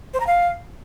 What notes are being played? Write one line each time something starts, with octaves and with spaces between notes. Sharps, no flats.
C5
A#5
F5